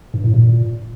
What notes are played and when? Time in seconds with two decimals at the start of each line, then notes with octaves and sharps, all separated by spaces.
0.14 G2
0.24 A2
0.34 A#2